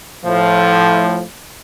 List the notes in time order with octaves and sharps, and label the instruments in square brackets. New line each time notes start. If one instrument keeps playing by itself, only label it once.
[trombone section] A2 F3